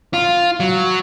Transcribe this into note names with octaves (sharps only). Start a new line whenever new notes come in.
F4
F#3